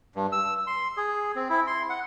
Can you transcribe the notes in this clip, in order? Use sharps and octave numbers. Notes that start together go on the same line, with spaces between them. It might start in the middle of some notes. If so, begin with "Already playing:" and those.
G2
E6
C6
G#4
C4
E4
C6
F#5